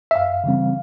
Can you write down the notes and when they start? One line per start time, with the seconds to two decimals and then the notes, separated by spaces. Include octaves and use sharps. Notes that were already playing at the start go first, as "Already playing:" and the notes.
0.11 E5
0.15 F#2 F5
0.44 C#3 E3 G3 C4